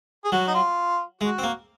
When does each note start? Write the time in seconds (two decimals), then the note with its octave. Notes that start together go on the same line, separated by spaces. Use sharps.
0.24 G#4
0.32 F#3 F#4
0.47 D#4
0.54 F4
1.21 G#3 F#4
1.38 C4
1.43 A#3